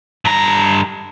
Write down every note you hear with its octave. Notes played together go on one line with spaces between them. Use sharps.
G2 A#5